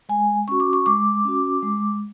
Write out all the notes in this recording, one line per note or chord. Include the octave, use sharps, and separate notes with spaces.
G#3 G#5
C#4 F#4 C#6
D6
C#6
G#3 D6
C#4 F#4
G#3